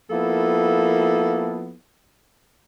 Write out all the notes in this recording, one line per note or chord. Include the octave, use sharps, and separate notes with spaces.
F3 A#3 B3 E4 A4